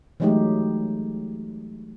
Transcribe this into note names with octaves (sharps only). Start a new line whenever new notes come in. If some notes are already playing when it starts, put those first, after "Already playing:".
E3 F#3 G#3 A3 D#4 G4